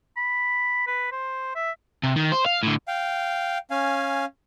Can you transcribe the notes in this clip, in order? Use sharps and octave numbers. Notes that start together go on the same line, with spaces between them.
B5
B4
C5
E5
C3
D#3
C5
F5
A2 D3
F5 G5
C#4 F5 G#5